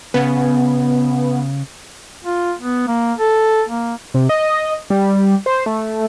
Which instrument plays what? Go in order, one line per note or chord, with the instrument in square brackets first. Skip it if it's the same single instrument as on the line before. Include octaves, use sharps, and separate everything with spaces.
[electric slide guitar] C#3 [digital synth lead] B3
[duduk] F4
B3
A#3
A4
A#3
[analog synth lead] C3
D#5
G3
C5
A3